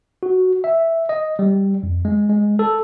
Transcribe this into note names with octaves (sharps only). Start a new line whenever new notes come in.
F#4
E5
D#5
G3
F2
G#3
G#3
A4